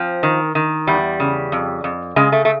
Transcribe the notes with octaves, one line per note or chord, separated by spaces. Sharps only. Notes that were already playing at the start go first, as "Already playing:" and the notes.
Already playing: F3 C4
D#3
D#3
E2 G3
C#3
F2
F2
C#3 G#3
A3
A3